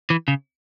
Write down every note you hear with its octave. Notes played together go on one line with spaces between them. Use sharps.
E3
C#3